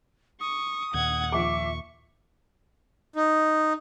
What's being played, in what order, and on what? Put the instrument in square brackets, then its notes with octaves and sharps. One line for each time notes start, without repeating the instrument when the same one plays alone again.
[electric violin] C#6 [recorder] D#6
[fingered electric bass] D#2 A#2 [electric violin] F#5 G#6
[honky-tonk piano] F3 D6 [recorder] E5 [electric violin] C#6
[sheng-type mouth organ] D#4